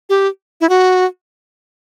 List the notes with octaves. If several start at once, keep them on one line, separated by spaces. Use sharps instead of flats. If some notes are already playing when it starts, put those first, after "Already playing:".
G4
E4
F#4